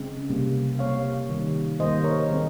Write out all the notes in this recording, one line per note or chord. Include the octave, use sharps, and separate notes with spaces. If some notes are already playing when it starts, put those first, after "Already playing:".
Already playing: C#3 G#3 C4
C3 G3 A#3
C3 G3 A#3 C#5 F5
D#3 G3 A#3
D#3 G3 A#3 C5 D#5
A#4 C#5
D#3 G#3 C4